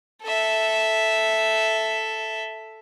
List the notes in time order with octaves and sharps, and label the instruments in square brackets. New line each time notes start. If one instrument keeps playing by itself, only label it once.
[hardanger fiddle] A4 E5